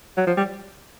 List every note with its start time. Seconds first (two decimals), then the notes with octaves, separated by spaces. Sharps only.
0.17 F#3
0.27 F3
0.37 G3